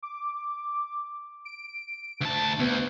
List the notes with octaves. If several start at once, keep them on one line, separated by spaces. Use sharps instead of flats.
D6
D7
D2 A5
D2 B3